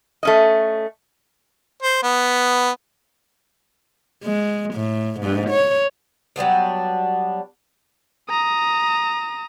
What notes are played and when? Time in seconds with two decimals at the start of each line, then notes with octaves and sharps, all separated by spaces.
0.23 A3 C#4 D#5
1.83 C5
2.03 B3
4.23 G#3
4.74 A2
5.20 G#2
5.49 C#5
6.36 F#3 G3 B3 D4
8.29 A#5 D#6